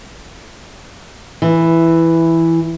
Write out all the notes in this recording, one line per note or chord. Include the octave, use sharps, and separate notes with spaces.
E3